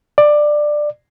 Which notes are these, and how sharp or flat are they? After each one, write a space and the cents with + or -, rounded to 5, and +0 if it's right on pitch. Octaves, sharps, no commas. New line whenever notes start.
D5 +15